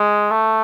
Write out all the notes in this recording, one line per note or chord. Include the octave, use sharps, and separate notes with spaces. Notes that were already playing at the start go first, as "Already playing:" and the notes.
Already playing: G#3
A3